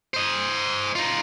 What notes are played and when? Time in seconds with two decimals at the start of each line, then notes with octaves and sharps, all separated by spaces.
0.14 C5 D#5
0.95 D#4 F4